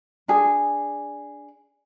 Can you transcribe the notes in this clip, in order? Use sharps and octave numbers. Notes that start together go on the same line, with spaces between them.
D4 G#4